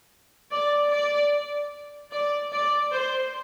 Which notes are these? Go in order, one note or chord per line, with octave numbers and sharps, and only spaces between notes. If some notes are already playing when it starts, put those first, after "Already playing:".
D5
D5
D5
D5
C5